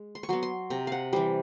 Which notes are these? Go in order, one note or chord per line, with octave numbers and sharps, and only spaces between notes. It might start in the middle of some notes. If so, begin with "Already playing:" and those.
Already playing: G#3
C6
C#6
F#3 B3 C6
C6
C3 A#5
F5 F#5
E3 G3 C5